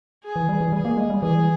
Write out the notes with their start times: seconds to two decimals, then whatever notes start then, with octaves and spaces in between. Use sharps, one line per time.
0.24 G#4
0.36 E3
0.49 G3
0.61 E3
0.72 G3 G#4
0.85 A#3
0.97 G#3
1.10 G3
1.22 E3 G#4